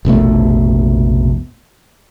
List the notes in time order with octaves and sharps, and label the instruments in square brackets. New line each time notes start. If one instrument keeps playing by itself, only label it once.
[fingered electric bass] F1 A#1 B2 A3